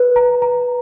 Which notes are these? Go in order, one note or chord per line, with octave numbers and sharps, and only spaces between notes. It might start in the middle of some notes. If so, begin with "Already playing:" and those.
Already playing: B4
A#5
A#5